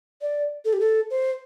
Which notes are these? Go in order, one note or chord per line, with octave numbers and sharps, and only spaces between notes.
D5
A4
G4
A4
C5